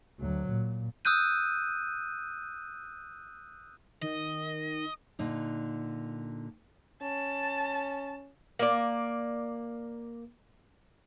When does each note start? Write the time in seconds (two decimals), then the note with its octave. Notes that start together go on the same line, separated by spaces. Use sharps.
0.20 D2 F#3
0.50 A#2
1.05 D#6 E6 F#6 G6 D#7
4.02 D#3 D#5
5.19 A#2 D3 D#4
7.03 C#4 A5
8.59 A#3 D5